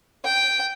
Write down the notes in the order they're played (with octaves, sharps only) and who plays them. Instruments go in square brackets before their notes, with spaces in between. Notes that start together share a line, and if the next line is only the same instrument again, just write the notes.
[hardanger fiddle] G5